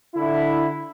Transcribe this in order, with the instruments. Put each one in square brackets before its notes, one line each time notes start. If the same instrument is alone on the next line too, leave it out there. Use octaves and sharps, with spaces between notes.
[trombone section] D3 E4